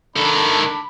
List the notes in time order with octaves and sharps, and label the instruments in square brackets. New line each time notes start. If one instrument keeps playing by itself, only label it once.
[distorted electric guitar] D#3 A4 [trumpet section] D4 B5